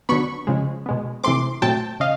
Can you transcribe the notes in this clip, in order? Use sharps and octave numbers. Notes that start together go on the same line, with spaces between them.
D3 F#3 B3 B5 C#6
C#3 F3 G#3
B2 G#3 B3
C3 E3 A3 C4 C6 D6
A#2 F#3 A3 C4 G5 A5
C#3 D#5 F5